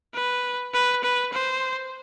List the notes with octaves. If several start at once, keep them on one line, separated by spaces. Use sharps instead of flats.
B4
B4
B4
C5